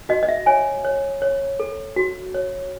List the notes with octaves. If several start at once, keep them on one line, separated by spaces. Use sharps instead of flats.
F#4 D#5
D#5
E5
C#5 G#5
C#5
C#5
A4
F#4
C#5